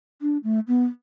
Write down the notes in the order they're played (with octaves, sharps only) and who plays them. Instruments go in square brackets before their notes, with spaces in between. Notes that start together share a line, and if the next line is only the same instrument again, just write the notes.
[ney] D4
A3
B3